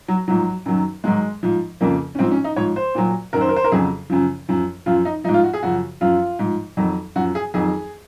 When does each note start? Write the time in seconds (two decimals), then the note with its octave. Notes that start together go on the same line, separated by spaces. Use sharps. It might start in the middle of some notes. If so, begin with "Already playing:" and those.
0.08 F#3
0.28 G#2 F3 F#3
0.66 F#2 D#3 F#3
1.04 G#2 D#3 F#3 G#3
1.43 G#2 F3
1.81 F2 C#3 F3 A#3
2.15 C#4
2.19 G#2 F3 C4
2.31 C#4
2.44 D#4
2.56 G#2 F3 C#5
2.76 C5
2.95 A#2 F#3
3.33 F#2 D#3 F#3 A#4
3.41 C5
3.49 A#4
3.56 C5
3.64 A#4
3.72 F2 C#3 F#3 G#4
4.10 F#2 C#3 F3
4.49 F#2 F3
4.86 F#2 F3 F4
5.05 D#4
5.24 F3 D#4
5.29 G#2
5.34 F4
5.44 F#4
5.53 G#4
5.63 F#2 C#3 F3 F#4
6.01 F#2 F3 F4
6.39 G#2 F3
6.77 F2 D#3 F#3
7.16 F#2 F3 F#4
7.35 G#4
7.54 F2 D#3 F#3 G#4